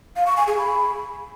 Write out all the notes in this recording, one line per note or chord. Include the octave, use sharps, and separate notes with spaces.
F5
C#6
G#5
G#4
B5